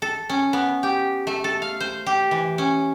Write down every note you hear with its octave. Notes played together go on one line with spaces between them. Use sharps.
A4
C#4
B3
G4
A3
A4
F5
C5
G4
E3
C#4